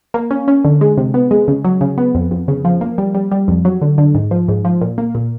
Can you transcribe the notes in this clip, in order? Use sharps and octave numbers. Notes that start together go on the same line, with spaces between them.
A#3
C#4
C#4
D3
G#3
C3
B3
G#3
C#3
F#3
C#3
B3
F2
F2
C#3
F3
A#3
G3
G3
G3
F2
F#3
D3
D3
G#2
F3
G#2
F3
A#2
A#3
A#2